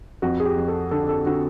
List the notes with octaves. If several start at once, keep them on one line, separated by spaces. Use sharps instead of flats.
F2 F#4
G#4
G4
F2
A4
D3 A4
A4
D3 F#4